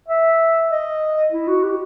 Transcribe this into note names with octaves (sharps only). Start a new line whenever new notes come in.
E5
D#5
E4
F#4
G4